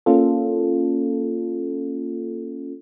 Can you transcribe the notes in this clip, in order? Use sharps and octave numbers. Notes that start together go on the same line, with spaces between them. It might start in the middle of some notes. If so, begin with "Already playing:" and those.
A#3 C#4 F4 A4